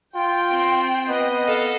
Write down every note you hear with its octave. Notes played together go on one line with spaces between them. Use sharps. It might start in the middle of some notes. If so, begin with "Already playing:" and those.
F4 G5
C4
B3 D#5
A4 F5